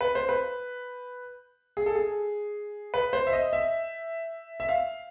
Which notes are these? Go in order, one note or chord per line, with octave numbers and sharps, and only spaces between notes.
B4
C5
B4
G#4
A4
G#4
B4
C5
E5
D#5
E5
E5
F5